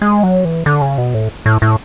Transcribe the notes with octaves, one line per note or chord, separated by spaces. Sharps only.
G#3
F#3
E3
D3
C#3
B2
A2
A2
A2